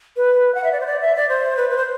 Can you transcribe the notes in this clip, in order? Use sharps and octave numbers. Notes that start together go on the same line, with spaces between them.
B4
F#5
E5
D5
C5
D5
E5
D5
C5
B4
B4
C5